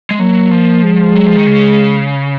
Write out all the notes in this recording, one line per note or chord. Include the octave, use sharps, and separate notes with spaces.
G#3
F#3 A#3
F3
G#3
F#3
F3
D#3
C#3